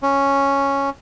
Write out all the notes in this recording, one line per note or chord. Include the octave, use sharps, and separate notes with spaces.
C#4